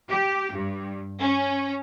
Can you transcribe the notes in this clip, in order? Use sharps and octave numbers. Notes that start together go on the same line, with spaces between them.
G4
G2
C#4